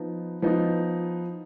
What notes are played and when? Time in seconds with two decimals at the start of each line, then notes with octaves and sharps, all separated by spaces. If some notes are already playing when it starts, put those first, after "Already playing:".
Already playing: F3 B3 D#4
0.42 F3 B3 D#4